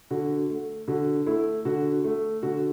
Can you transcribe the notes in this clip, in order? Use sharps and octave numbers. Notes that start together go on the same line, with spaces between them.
D3 F#4
A3
D3 F#4
A3 E4
D3 F#4
A3
D3 F#4